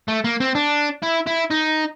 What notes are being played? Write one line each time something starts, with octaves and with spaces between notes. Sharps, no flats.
A3
A#3
C4
D4
E4
E4
D#4